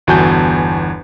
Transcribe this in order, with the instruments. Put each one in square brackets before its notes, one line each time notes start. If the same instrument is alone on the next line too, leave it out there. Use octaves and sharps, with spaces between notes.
[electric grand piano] G1 E2 F#4 G#5 A5 G6